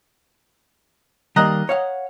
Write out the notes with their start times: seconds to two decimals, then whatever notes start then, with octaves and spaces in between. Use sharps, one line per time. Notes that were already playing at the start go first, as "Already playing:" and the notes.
1.36 D#3 G3 A#3 D#5 A#5 F#6
1.69 C#5 F5 F#5